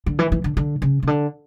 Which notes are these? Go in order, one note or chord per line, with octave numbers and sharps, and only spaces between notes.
D3
E3
E3
D3
D3
C#3
C#3
D3